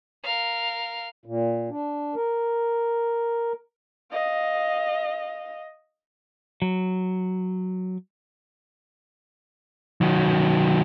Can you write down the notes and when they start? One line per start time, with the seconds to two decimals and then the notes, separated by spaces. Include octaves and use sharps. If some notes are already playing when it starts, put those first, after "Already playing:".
0.24 A#4 F5
1.25 A#2
1.69 D4
2.15 A#4
4.11 D#5 F5
6.62 F#3
10.01 D#3 F#3